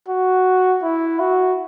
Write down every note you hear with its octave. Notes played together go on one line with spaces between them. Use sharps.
F#4
E4
F#4